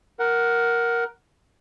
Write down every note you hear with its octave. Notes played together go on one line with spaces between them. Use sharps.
A#4 F#5